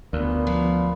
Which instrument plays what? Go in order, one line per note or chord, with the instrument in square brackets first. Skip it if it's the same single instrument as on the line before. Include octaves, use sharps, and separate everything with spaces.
[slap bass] D2 [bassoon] A#2 [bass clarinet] B3
[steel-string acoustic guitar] F3